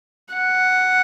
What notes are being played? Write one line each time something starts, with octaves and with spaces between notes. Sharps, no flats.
F#5